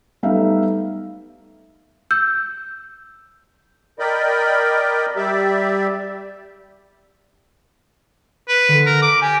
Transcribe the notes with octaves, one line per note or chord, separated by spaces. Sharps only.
G3 A3 B3 D#4 E5 F5
E6 G6
A#4 D5 D#5 G5 B5
G3 G4 D5 E5
B4
D3
A#4
D6
G4 G#5